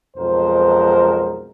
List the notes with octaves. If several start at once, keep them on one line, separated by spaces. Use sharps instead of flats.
B1 F2 G#3 A#4 C5